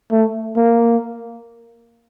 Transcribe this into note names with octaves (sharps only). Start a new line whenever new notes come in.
A3
A#3